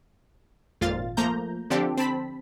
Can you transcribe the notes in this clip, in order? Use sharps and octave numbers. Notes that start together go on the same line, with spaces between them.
G#1 F2 A#2 F4 F5 A6
F3 A3 A#3 A#5 G6
D3 F3 C4 D4 G4 A4
C4 A5 B5 B6